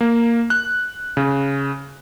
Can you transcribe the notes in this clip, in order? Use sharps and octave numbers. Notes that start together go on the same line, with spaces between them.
A#3
F#6
C#3